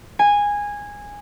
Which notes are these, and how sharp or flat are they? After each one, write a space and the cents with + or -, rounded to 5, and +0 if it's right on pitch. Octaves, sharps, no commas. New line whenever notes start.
G#5 -15